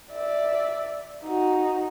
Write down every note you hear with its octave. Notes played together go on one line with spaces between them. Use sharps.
D5 E5
D#4 F#4